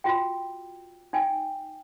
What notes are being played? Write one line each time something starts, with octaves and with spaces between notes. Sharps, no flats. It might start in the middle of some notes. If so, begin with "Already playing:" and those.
F4 F#4 G5
D#4 G5 G#5